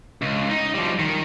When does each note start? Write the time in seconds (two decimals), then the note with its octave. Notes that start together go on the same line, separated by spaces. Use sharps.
0.22 C#2
0.50 D#4
0.75 F3 G3
0.99 D#3